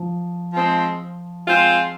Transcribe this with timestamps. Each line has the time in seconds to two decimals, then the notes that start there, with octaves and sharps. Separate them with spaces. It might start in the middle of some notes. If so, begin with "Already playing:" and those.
Already playing: F3
0.53 F3 G#3 C4
1.47 G#3 C4 F4 C5